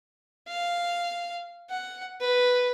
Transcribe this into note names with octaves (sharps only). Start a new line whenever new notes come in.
F5
F#5
B4